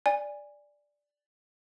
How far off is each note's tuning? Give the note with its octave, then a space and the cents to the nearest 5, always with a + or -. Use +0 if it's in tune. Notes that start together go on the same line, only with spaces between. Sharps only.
D5 +0 G#5 -20